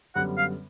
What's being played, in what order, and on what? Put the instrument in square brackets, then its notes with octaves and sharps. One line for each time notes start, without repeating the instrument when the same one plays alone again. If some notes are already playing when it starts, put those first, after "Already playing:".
[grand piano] F#2 D3 G3 B3 [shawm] F#5
[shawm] F5